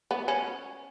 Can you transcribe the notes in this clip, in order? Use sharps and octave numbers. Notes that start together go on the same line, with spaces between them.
B3
C#4